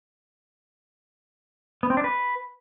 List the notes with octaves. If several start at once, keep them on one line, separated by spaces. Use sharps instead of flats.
B3
C4
D4
B4